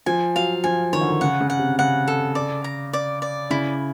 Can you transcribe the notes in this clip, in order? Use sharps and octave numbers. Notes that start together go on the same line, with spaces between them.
F3 G#5
F#3 F5
F3 G#5
D#3 C#5
D3
D#3
C#3 F#5
C#3
F#5
C3
C#3 F#5
A4
D5
A#5
D5
D5
C#3 E4